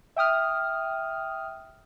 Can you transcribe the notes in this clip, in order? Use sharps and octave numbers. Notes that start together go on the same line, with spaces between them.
E5 G5 D#6 F6